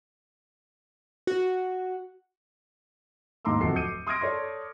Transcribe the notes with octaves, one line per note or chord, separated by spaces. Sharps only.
F#4
D#2 G#2 A#5 C6 D6 E6
D1 F2 F#4 A4 C7
D#6 G6 C#7 D#7
C6 D#6 F6 G#6 A#6 D7
A4 C#5 D5 C6